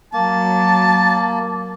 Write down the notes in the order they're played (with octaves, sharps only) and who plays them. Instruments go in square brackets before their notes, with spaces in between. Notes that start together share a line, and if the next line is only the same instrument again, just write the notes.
[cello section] F#3 [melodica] A#3 [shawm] A5